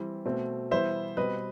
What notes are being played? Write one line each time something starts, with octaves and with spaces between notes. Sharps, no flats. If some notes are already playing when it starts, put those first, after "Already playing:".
Already playing: E3 G3 C4
B2 A3 C4
E3 G3 B3 C5 E5
B2 G3 C4 B4 D#5